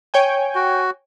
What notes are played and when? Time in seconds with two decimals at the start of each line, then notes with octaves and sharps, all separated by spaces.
0.14 C#5 G5 G#5
0.55 F#4